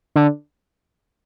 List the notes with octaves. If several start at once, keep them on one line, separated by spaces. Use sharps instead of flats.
D3